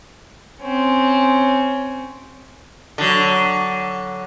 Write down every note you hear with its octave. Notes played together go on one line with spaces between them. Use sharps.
C4 C#4
D3 F#3